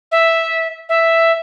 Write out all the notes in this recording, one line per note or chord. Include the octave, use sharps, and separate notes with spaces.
E5
E5